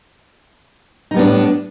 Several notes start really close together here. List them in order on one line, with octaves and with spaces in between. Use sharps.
D#4 G3 B3 D4 A2